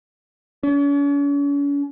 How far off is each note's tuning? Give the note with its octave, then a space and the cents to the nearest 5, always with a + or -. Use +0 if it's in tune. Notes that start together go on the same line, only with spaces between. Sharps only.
C#4 +45